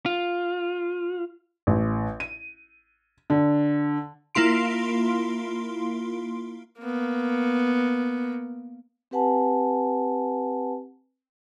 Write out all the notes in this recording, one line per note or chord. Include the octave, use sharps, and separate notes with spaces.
F4
A1
D#7
D3
A#3 E4 F4 C6 D7
A#3 B3
C4 G4 B4 F#5 G#5 A5